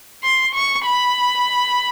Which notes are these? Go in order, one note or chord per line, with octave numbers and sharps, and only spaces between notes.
C6
C#6
B5